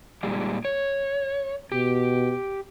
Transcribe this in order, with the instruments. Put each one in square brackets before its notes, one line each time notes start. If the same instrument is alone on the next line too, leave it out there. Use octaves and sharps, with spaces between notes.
[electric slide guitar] A#2 G3 G#3
C#5
[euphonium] B2 [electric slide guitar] G4